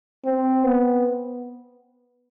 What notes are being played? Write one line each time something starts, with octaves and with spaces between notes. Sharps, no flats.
C4
B3